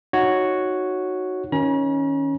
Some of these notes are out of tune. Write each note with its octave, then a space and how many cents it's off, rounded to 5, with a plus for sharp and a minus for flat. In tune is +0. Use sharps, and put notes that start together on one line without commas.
D#4 +0 F#4 +0 C#5 +0
D#3 +25 C#4 +0 A#5 +45